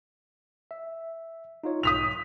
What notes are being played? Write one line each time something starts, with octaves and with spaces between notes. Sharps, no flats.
E5
D#4 F4 C#5
B1 G#2 D#6 G6 B6 F7